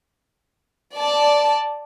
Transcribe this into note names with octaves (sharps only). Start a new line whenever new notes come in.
D5 A5